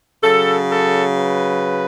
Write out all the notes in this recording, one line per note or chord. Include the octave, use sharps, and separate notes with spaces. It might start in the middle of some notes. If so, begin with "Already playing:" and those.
C#3 F#3 A4
A4
B4